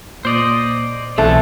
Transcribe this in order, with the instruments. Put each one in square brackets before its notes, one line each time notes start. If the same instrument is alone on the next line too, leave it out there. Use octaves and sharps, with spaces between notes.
[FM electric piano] A#2 [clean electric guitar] C5 D5 D#5
[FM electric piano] B1 B2 [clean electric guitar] D3 E3 C4 [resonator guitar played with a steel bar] A3